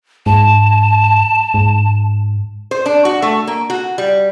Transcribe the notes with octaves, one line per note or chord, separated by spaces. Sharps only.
G#2 A5
G#2
C5
D4
F#4
A3
A#3
F#4
G3